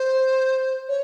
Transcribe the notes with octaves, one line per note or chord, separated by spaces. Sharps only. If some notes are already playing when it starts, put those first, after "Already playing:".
Already playing: C5
C#5